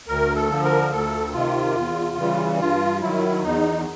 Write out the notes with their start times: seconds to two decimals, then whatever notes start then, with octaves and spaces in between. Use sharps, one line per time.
0.08 D2 A#4
0.36 A4
0.50 D3 F3
0.64 A#4
0.92 D2 A4
1.33 C3 D#3 F4
1.76 E2
2.18 C#3 E3 G3
2.60 G2 F4
3.02 D#3 F#3 E4
3.43 E2 D#4